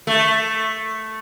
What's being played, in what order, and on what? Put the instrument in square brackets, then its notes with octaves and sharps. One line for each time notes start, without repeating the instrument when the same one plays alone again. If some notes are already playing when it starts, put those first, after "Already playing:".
[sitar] A3